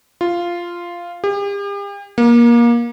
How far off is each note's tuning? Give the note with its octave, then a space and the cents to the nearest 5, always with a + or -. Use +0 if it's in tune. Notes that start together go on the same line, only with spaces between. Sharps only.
F4 -5
G4 +40
A#3 +25